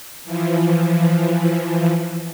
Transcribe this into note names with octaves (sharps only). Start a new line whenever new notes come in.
E3 F3